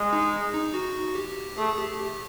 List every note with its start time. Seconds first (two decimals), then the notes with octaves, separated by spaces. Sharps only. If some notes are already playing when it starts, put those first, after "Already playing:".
Already playing: G#3
0.13 D#4
0.54 D#4
0.74 F#4
1.15 G4
1.58 A3 G#4
1.77 G4
1.99 G4